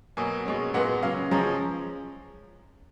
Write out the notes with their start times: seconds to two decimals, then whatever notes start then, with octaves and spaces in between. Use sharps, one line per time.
0.17 B2 F#3 A#3 G#5
0.46 B2 G#3 C#4
0.74 A#2 G#3 B3 F#5
1.02 C#3 F#3 C#4 F5
1.31 C#3 F3 G#3 C#4 A#5